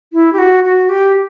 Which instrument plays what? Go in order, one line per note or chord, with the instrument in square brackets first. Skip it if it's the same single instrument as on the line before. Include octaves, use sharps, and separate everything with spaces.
[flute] E4
G4
F#4
F#4
G4